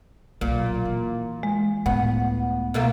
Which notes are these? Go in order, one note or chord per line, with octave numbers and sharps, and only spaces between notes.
B1 A#2
E3
G#3
C#2 A2 B3 F#5
B2 A3 A#3